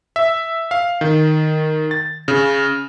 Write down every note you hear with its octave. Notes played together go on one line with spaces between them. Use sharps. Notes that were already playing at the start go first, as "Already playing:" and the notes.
E5
F5
D#3
A6
C#3